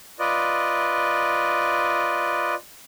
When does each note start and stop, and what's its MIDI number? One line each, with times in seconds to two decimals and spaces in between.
0.19 2.55 65
0.19 2.55 71
0.19 2.55 74
0.19 2.55 75